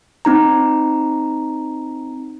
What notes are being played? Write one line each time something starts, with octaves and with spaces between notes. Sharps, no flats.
C4 D#4 A#5